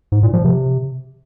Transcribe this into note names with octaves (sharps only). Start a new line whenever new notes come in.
G#2
A#2
F3
C3